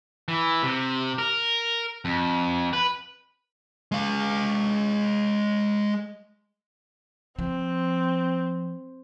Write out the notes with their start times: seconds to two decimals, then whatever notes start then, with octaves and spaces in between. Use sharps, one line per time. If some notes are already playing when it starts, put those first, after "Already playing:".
0.28 E3
0.63 C3
1.18 A#4
2.05 F2
2.73 B4
3.92 G#3 F5
7.39 F3 C4